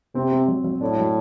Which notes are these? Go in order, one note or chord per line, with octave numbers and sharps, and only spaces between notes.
C3 C4
C4
F#3
F#3
A2 D4
F#3